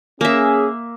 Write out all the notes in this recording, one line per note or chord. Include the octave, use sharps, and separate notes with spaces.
A#3 C#4 G#4 E5